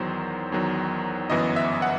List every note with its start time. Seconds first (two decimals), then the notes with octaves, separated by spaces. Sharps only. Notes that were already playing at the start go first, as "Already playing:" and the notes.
Already playing: E2 D#3 F#3 C5
0.52 E2 D#3 F#3
1.30 G1 F#2 E3 B3 D#5
1.56 E5
1.82 F#5